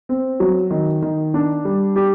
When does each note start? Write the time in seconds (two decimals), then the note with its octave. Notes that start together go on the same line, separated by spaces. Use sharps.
0.09 C4
0.40 F#3
0.71 D#3
1.02 D#3
1.34 D4
1.65 G3
1.96 G4